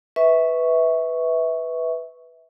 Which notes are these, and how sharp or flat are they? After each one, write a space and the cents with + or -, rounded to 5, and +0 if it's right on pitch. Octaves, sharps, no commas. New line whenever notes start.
B4 +0 E5 -25 C#6 +0